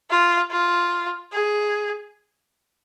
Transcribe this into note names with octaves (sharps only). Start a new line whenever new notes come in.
F4
F4
G#4